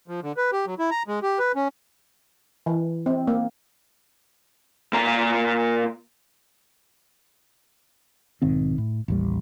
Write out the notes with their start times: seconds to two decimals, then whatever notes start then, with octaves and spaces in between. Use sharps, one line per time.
0.08 F3
0.23 D3
0.37 B4
0.52 G4
0.66 F#3
0.79 E4
0.91 A#5
1.08 G#3
1.23 G4
1.39 B4
1.56 C#4
2.66 E3
3.06 C4
3.27 A#3
4.93 A#2 A#5
8.42 B1 G#2 D#3 C4
8.78 A2
9.08 A1 D#2 G3